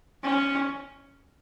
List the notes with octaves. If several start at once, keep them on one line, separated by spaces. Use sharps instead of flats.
C#4